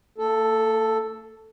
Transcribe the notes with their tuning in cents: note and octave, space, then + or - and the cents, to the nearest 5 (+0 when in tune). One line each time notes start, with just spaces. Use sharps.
A#3 -45 A4 +0